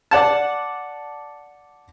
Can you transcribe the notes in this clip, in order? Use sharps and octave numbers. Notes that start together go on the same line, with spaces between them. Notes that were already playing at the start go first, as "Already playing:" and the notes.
D5 F#5 A5